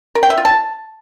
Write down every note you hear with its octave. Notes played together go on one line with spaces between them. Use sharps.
A#4
G5
E5
F4
A5